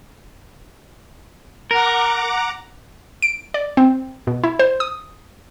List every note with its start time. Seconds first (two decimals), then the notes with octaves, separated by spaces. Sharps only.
1.71 A#4 F#5 A#5 D6
3.22 D7
3.54 D5
3.77 C4
4.27 B2
4.44 E4
4.59 C5
4.80 D#6